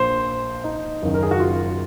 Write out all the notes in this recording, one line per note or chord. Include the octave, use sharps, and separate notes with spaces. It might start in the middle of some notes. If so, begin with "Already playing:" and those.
Already playing: A#1 A#2 C5
D#4
F#1 F#2 D#3
A#4
G#4
F#4
F4